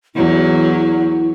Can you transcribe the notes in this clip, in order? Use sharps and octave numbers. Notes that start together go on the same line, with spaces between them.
E2 F#3 E4